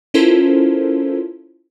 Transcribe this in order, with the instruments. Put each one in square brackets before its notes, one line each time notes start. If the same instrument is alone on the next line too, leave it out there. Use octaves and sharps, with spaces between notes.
[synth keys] C#4 E4 F4 A4 A#4 C5